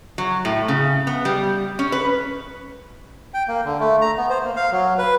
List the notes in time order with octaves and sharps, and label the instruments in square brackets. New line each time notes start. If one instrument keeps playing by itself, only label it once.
[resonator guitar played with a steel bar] F#3
A2
C#3
B3
G3
C#4
B4
[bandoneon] G5
A#3
D3
A3
A#5
B3
C5
A#3
F5
F#3
B4